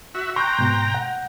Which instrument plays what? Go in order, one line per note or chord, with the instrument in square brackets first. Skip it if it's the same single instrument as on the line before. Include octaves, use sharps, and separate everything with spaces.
[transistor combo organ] F#4 E5
[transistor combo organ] G5 A#5 [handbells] C6 F#6 G6 [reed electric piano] C#6
[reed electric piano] G#2 B2 [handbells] G6
[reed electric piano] F#5